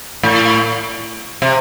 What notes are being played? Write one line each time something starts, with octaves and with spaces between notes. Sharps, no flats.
A2
C3